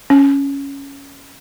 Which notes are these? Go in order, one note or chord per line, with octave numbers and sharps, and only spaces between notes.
C#4